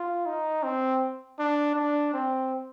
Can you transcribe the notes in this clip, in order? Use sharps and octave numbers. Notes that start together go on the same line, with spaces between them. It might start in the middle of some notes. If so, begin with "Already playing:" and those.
Already playing: F4
D#4
C4
D4
D4
C4